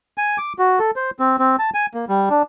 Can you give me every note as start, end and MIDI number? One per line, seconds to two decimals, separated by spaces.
0.18 0.38 80
0.38 0.53 86
0.59 0.79 66
0.79 0.91 69
0.96 1.11 72
1.19 1.36 60
1.39 1.56 60
1.59 1.70 81
1.74 1.86 80
1.94 2.05 58
2.09 2.29 55
2.30 2.42 62